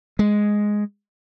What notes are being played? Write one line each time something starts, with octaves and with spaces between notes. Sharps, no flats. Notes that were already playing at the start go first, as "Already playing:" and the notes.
G#3